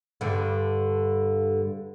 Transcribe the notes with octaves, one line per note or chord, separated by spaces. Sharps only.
G2 D3